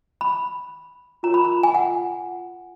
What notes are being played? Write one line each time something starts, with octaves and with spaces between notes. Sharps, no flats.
B5
F4 A#4 C#5 A#5
B5
A#5
G#5
F#5